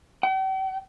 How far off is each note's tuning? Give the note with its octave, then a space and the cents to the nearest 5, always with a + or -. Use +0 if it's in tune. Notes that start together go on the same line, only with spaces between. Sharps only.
G5 -45